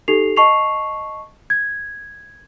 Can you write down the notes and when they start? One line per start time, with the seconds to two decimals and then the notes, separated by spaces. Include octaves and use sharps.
0.08 D#4 G4 A4 C7 F7
0.37 D#5 A5 C#6 C7 F7
1.50 G#6